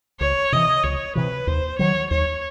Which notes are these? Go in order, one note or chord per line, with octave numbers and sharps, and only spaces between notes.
C#2 C#5
C3 E3 D#5
C#2 C#5
C3 E3 B4
D#2 C5
D#3 F#3 C#5
D#2 C#5